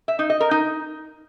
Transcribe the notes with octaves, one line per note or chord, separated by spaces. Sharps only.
E5
D#4
D#5
A#4
D#4